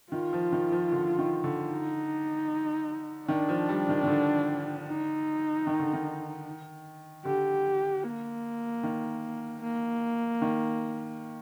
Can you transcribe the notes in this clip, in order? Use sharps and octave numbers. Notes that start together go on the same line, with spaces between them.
D#3 F4
F3
D#3
F3
D3
D#3
D3
D#4
D#3 D4
F3
G3
D#3
D#3
D3
D#4
D#3
D3
D#3
D3 G4
A#3
D#3
A#3
D#3